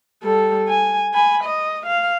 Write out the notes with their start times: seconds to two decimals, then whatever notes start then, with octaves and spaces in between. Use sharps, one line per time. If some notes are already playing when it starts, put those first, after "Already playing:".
0.23 G3 A4
0.68 G#5
1.14 G#5 B5
1.44 D#5
1.86 F5